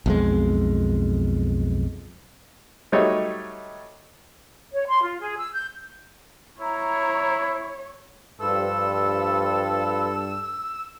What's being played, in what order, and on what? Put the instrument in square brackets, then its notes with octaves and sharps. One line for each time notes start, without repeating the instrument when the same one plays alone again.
[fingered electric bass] B1 F2 G#3
[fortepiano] F#3 G3 A3 D#4 C#5 D#5
[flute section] C#5
C6
F4
G#4
E6
G6
[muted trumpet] E4 [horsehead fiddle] C#5 [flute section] A#5
[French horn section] G2 [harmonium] F3 F4 B4 [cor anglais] A4 [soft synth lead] E6